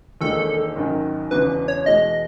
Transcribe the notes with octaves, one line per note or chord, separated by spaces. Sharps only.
E1 D#2 D#3 G#3 D#4 A4
G#1 F#2 D#3
E1 E2 C#3 B4
C#5
E2 B2 G#3 D#5